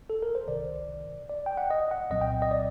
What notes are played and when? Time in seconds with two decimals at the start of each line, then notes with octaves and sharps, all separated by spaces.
0.10 A4
0.23 A#4
0.35 C5
0.47 C2 C3 D#3 D5
1.29 D5
1.46 G5
1.57 F#5
1.70 D#5
1.91 F#5
2.11 C2 A#2 F#3 C4 D#5
2.21 G5
2.42 D#5
2.51 D5